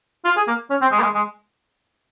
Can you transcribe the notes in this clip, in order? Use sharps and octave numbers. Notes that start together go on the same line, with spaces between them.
F4
G#4
A#3
C#4
C4
G#3
A#3
G#3
G#3